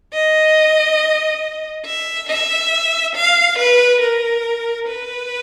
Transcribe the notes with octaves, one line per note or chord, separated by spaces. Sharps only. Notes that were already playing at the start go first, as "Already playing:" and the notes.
D#5
E5
E5
F5
B4
A#4
B4